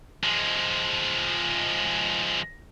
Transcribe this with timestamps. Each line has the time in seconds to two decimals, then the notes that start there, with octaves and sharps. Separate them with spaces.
0.24 F3 G#3